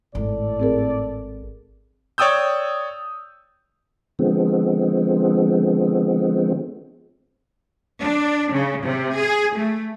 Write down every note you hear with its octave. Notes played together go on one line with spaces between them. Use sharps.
G#1 A2 A4 D5
C4 G#4 A#4
C#5 D5 G5 D#6 E6 G6
D3 F3 G#3 B3 C4
D4
C#3
C3
G#4
A3